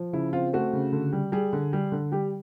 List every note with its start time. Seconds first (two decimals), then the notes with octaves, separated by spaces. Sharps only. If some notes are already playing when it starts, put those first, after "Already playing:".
Already playing: F3
0.13 C#3 E4
0.33 C4 F4
0.53 A3 F#4
0.73 C#3
0.93 D3
1.13 G3
1.32 G3 G#4
1.53 D3
1.73 G3
1.92 D3
2.12 G3 G4